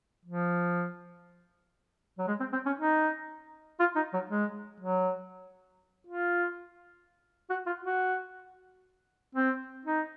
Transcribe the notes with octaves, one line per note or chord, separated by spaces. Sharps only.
F3
F#3
G#3
C4
C4
C#4
D#4
F4
D#4
F#3
G#3
F#3
F4
F#4
F4
F#4
C4
D#4